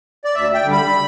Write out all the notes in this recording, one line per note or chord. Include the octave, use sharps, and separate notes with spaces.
D5
D2 E5
G5
D3 G3
B5